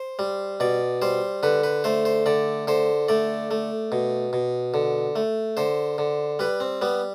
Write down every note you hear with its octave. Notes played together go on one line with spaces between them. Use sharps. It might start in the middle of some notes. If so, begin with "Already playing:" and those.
Already playing: C5
G3
B2 D5
G3 C5
D3 B4
B4
A3 C5
C5
D3 D5
D3 C5
A3 D5
A3
B2
B2
D3
A3
D3 C5
D3
G3 B4
C4
G3 B3